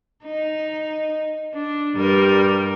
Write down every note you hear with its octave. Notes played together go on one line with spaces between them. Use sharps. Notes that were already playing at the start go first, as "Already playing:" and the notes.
D#4
D4
G2 G3 A#4